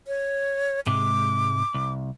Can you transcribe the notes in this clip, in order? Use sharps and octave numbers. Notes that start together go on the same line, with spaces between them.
C#5
G#2 C3 G#3 D6
C2